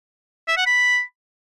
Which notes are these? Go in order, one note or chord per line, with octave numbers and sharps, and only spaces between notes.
E5
F#5
B5